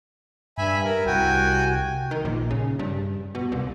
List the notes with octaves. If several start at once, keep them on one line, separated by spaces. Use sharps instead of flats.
G2 E5 G#5 B5
A#4
C2 F#4 G5 G#5
D#3
A#1
C#3
G2
B2
C2